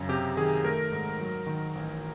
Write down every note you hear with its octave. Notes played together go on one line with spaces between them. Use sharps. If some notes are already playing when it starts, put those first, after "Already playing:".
Already playing: F#2 C#3
C3 G4
D#3 G#4
A3 A#4
G#2
F#3
D#3
A1